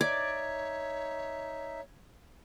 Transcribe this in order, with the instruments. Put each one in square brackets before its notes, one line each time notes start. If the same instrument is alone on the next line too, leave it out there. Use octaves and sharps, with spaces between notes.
[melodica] D#4 E5 [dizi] C#5 [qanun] D5 [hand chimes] G#6